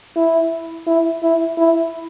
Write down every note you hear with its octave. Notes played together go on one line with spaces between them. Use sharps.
E4
E4
E4
E4